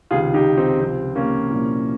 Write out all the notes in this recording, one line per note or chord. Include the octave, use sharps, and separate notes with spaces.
C#2 C3 D#3 F4 G#4
D#4 G4
C4 D#4
C#2 C3 F3 C4
A#3 C#4
C2 A#2 F3